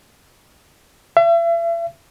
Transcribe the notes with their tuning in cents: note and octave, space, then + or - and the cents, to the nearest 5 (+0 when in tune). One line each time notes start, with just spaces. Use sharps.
E5 +40